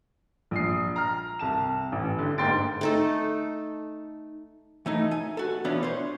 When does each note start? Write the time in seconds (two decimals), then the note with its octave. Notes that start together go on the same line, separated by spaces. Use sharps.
0.51 A#1 D#6 C7
0.96 A#5 F6
1.39 C2 A5 E7
1.92 A1
2.19 D3
2.38 G#2 A#3 G5 C6 A6 D7
2.81 A3 D#4 A4
4.86 E3 A3 D#4
5.11 G#5
5.37 F#4 A4
5.65 E3 B3 C#4 D4 F4
5.83 C5 C#5